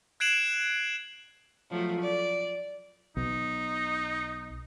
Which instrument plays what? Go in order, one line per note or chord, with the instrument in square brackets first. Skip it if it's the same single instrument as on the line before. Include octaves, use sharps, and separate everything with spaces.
[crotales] F#6 G#6 C7 D7 E7 F#7
[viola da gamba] F3 F#3 A3
D5
[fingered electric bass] B1 [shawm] D#4